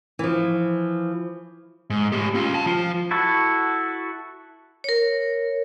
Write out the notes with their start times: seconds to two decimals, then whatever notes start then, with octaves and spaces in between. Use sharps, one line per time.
0.19 E3 F3
1.90 G#2
2.12 A3 G4
2.34 C#4 F4
2.54 G5 A5
2.66 F3 F4
3.11 E4 F#4 A4
4.84 A#4 C#5